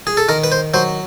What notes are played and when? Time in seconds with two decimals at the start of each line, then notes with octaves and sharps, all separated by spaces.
0.07 G#4
0.17 A4
0.29 D#3 A#4
0.44 B4
0.52 C5
0.74 F#3 C5